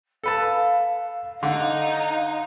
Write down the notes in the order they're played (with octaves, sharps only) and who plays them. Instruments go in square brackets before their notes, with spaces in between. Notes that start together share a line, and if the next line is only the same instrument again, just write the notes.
[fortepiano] A4 B4 A5 [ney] F5
[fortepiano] D3 [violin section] D#4